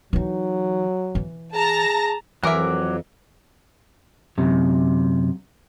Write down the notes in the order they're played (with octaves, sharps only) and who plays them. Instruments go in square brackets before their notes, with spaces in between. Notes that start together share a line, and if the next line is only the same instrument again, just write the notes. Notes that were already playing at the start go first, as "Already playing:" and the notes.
[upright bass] E3 D#4 [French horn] F#3
[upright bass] E3
[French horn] G#4 [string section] A5 A#5 A#6
[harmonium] F2 [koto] E3 [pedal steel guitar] F#3 D6 [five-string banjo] A#4 E5
[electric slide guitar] F#2 C3